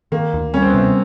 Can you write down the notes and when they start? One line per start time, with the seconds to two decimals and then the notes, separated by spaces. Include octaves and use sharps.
0.12 D#3 A#3
0.34 D2
0.54 G3 C#4
0.62 C4
0.70 B3
0.74 C3 C4